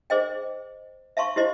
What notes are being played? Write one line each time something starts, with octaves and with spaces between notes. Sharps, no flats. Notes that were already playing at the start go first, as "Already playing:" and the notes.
G#4 C5 D#5 G5
E5 F5 A5 C6 C#6
E4 G4 C5 D#5